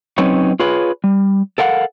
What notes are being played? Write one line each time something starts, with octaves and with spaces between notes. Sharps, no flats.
F#3 C4 C#4 D#4 B4 C#5
F4 G#4 B4 C#5
G3
A4 A#4 F5 F#5